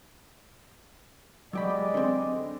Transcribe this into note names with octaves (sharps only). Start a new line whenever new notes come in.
F#3 G#3 G4 D5 D#5 B5
D3 C4